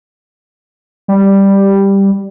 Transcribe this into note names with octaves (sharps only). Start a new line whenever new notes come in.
G3